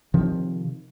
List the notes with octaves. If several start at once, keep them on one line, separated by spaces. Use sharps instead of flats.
C3 D#3 F3 C4